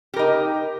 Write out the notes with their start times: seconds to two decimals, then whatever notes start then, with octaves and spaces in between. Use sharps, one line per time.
0.14 G4
0.16 A#4
0.19 D#4